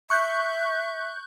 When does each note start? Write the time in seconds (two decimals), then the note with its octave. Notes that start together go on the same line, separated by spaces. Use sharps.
0.10 E5 C#6 F#6 G6